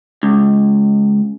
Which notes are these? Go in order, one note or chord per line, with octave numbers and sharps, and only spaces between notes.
C#2